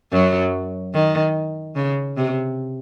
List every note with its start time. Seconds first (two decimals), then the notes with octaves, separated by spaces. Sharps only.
0.12 F#2 F#3
0.94 D#3
1.76 C#3
2.17 C3